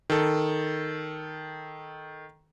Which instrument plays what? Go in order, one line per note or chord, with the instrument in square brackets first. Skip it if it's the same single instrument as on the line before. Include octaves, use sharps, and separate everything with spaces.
[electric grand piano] D#3 A4